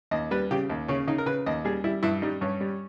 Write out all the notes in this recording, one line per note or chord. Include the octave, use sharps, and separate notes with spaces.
D#2 D#5
G3 B4
C#3 G4
D#2
C#3 C#4
C#3 D#4
A#4
C#3 B4
D#2 D#5
G3 G#4
G3 E4
G2 E4
G3 D#4
G2 C#4
G3